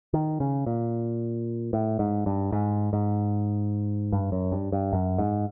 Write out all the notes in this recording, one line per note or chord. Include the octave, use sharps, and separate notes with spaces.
D#3
C#3
A#2
A2
G#2
G2
G#2
G#2
G2
F#2
G2
G2
F#2
G#2